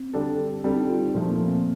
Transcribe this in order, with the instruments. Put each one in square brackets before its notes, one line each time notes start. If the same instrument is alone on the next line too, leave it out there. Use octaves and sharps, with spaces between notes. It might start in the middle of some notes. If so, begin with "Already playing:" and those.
Already playing: [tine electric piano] C4
[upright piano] D3 G3 D4 A4
[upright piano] D3 G3 D4 A4 [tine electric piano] C4
[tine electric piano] D#4
F4
[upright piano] A#2 F3 A3
[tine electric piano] A#3
C4